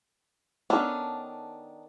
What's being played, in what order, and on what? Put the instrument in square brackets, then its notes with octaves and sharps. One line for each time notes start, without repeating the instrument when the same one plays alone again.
[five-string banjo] D#3 B3 C#4 D4 A4